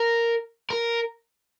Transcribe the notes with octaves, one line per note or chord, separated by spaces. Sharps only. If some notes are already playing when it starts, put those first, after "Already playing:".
Already playing: A#4
A#4